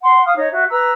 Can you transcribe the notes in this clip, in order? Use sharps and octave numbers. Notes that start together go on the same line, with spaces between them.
F#5 C6
F5 D#6 F6
D#4 C#5 D#5
F#4 E5
B4 A#5 E6